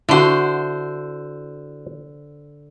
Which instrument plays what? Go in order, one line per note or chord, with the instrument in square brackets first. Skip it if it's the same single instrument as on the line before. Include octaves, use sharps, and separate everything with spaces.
[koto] D3 C5 [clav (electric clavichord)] E4 F#4